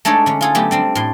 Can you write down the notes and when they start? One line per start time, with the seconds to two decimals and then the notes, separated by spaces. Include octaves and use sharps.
0.05 G#3 A3 D4 D#4 A4 C#5
0.26 D3 C#4
0.41 F4 G#4 A4
0.55 F#3 A3 B3 G4
0.71 G3 C4 D4
0.95 A2 C6